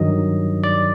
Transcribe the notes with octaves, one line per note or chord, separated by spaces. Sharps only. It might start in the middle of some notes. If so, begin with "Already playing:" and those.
Already playing: G2 D#3 F#3 D#5
D5